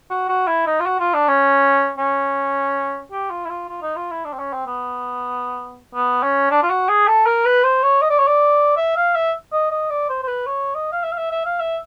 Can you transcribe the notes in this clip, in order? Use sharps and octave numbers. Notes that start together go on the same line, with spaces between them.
F#4
F#4
E4
D#4
F4
F#4
F4
D4
C#4
C#4
G4
F4
E4
F4
F4
D#4
F4
E4
D4
C4
C#4
C4
B3
B3
C#4
D4
F4
F#4
G#4
A4
A#4
B4
C5
C#5
D#5
D5
C#5
D5
E5
F5
E5
D#5
D#5
D5
C5
C5
B4
C#5
D#5
F5
E5
F5
E5
E5
F5
E5